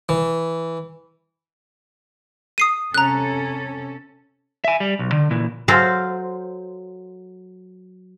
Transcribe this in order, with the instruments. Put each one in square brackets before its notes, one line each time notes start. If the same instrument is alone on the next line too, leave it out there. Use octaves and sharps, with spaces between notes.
[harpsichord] E3
[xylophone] D#6 C7 D#7
[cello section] C3 C#4 A4 [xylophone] A#5 F#6
[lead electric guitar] E5 G#5
G3
B1
D3
A#2 E3
[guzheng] F#3 A4 C5 F5